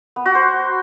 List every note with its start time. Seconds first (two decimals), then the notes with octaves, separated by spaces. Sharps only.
0.16 B3
0.26 F#4
0.35 C5